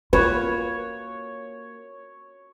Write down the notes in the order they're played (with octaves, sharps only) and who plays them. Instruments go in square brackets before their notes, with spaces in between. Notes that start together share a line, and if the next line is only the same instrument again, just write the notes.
[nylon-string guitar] A#3 [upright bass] F4 [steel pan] B4 [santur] C#5